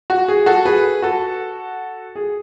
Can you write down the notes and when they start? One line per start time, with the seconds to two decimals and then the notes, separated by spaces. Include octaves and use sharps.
0.10 F#4
0.28 G#4
0.46 F#4 A4
0.65 G#4 B4
1.02 F#4 A4
2.16 G#4